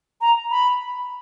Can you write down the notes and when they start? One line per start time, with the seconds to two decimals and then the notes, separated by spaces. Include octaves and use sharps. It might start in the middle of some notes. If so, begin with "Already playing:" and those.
0.21 A#5
0.51 B5